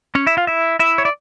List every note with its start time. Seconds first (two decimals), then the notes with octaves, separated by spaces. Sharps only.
0.15 C#4 C#5
0.27 E4 E5
0.37 F4 F5
0.47 E4 E5
0.79 E4 E5
0.98 C#5
1.05 D5